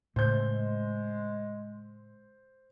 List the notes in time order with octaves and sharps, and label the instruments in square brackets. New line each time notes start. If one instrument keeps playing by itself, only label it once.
[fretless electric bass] A2 C#3 [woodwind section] G#3 [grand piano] C5 G6